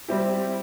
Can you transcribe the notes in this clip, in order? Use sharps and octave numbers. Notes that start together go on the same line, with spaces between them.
G3 C4 E4 G4